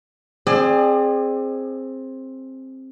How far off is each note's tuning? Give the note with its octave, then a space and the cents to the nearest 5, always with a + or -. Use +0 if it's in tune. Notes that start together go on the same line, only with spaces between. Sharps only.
C4 +15 G#4 +0 D5 +35